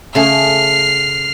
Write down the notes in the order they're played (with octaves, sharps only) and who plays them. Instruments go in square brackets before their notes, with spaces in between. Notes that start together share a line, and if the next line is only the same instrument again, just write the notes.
[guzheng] C#3 A3 G#4 [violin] F6 C7